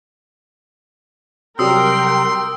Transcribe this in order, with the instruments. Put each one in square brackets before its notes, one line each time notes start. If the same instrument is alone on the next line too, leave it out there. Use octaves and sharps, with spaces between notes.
[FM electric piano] C3 F#3 G3 [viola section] A#4 G5 [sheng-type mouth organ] C6 [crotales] D#6 E6